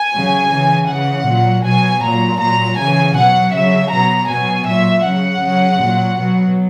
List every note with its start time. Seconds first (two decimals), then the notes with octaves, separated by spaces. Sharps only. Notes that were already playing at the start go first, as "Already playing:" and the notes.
Already playing: G#5
0.14 C#3 F#3
0.51 C#3 E3
0.89 C#3 E3 F#5
1.28 A#2 F#3
1.65 B2 F#3 G#5
2.03 A#2 F#3 A#5
2.41 A#2 F#3 A#5
2.78 C#3 E3 G#5
3.17 B2 F#3 F#5
3.54 C#3 F#3 E5
3.92 B2 F#3 A#5
4.29 B2 F#3 G#5
4.68 A#2 F#3 E5
5.06 C#3 F#3 F#5
5.43 C#3 F#3
5.81 A#2 F#3
6.18 B2 F#3